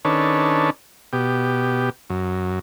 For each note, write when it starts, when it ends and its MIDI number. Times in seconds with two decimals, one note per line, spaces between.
0.05 0.70 51
0.05 0.70 61
0.05 0.70 62
0.05 0.70 69
0.05 0.70 71
0.05 0.70 73
1.13 1.90 47
1.13 1.90 67
2.10 2.59 42